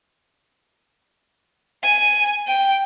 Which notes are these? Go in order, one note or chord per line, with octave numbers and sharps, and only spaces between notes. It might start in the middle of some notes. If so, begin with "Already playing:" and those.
G#5
G5